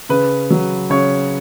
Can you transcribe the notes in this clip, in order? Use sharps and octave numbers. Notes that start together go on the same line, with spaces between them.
C#3 B4
F#3
C#3 C#5